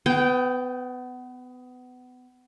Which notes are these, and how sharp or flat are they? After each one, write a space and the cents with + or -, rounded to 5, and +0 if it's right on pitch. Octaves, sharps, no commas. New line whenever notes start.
B3 +25 G5 -15